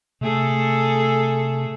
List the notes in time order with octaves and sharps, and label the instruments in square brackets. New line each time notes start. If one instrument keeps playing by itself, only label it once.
[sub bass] C3 [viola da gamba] A3 G#4 A4